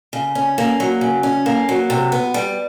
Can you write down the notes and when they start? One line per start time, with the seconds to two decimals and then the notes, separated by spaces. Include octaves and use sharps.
0.13 C#3
0.35 C#4
0.58 A#3
0.80 F#3
1.01 C#3
1.23 C#4
1.46 A#3
1.69 F#3
1.90 C3
2.12 B3
2.34 G3